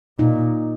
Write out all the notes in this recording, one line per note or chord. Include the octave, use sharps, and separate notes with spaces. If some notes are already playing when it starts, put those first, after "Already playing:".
A#2 D#4